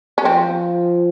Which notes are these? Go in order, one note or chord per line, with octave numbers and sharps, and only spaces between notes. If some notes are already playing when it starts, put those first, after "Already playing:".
C#4
F3 C4